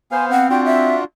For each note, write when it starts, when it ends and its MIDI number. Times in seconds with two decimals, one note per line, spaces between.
0.11 0.49 59
0.11 0.25 72
0.11 0.49 77
0.11 0.25 80
0.31 0.95 60
0.31 0.50 78
0.50 1.04 62
0.50 1.04 65
0.50 1.04 66
0.50 0.62 79
0.65 0.96 76